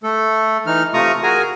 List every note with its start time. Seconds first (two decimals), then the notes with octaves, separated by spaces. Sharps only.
0.03 A3 A4
0.66 E3 D#4 F6
0.94 C3 A3 F4 A#5 C#6 D#6
1.23 F#4 G#4 A#4 G#5 A#5